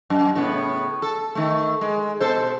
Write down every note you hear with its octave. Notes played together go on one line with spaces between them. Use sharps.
F#2
A2 C#3 B3
A4
D#3 A3
G#3
B2 A4 C5